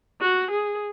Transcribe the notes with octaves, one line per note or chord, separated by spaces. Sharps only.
F#4
G#4